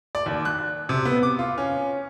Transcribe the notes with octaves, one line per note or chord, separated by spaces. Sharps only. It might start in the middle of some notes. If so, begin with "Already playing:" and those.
D5
D#2
F#6
C3
B3
D6
F4
C#4